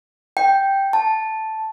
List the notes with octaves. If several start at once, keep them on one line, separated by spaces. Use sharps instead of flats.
G5
A5